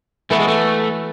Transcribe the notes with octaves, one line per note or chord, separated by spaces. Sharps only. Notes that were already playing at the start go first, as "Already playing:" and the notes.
E3 A3 B3 F#4 A4
G#3
A3